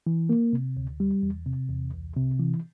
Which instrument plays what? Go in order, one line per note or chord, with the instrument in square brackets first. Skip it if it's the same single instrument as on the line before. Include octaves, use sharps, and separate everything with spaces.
[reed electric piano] E3
A#3
C3
D2
G3
E2
C3
E2
C2
C3
E3